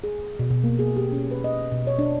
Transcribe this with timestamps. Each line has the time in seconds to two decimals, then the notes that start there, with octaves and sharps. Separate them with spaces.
0.04 G#4
0.39 B2
0.51 B2
0.64 A#3
0.79 G#4
0.96 G4
1.12 C#4
1.31 B4
1.44 D#5
1.72 B2
1.87 C#5
1.99 D4